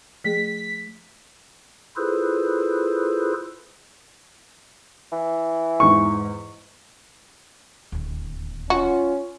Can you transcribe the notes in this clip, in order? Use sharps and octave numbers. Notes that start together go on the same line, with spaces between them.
F3 A3 G#4 B6
E4 F4 G#4 A4 B4 C5
E3
E2 G#2 C#6
D1 D#2
C#4 F4 F#4